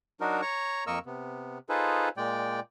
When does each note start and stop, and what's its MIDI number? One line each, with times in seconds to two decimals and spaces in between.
0.21 0.41 54
0.21 0.41 62
0.21 0.41 63
0.21 0.41 66
0.21 0.41 70
0.42 0.84 73
0.42 0.84 82
0.42 0.84 85
0.87 0.99 41
0.87 0.99 58
0.87 0.99 70
0.87 0.99 75
0.87 0.99 85
0.87 0.99 88
1.06 1.58 48
1.06 1.58 59
1.69 2.09 63
1.69 2.09 65
1.69 2.09 68
1.69 2.09 69
1.69 2.09 71
1.69 2.09 72
2.17 2.60 46
2.17 2.60 56
2.17 2.60 74
2.17 2.60 79